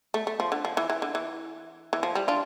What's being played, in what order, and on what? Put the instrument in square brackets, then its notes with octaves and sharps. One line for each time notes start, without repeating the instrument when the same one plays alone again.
[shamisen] A3
A3
F3
D3
F3
E3
E3
D3
E3
E3
F3
G3
D4 F4